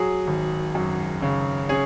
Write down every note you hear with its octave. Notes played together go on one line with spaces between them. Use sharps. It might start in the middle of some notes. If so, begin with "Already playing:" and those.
Already playing: F#3 G#4
G#1
F#2
C#3
C#4 G#4